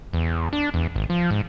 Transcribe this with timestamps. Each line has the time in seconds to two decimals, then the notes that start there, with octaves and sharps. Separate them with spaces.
0.13 E2
0.53 D4
0.74 E2
0.96 G#1
1.10 F3
1.31 G#2